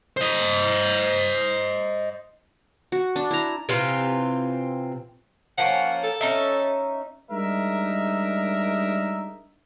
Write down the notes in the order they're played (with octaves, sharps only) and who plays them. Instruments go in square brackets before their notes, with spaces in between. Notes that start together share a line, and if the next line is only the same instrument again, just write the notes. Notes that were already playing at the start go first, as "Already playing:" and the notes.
[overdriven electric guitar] C5 D#5
[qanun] F#4
D4
E4 A#5
[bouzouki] C3 E3 C4 F4
[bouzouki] F3 A#3 C#4 [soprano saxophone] F#5
[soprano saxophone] A4
[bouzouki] C#4 D#4 E5
[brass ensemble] G3 G#3 D4 D#4 A#4 E5